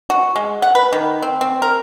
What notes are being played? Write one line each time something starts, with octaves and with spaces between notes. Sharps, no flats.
F#4
G#3
F#5
B4
D#3
C4
C4
A#4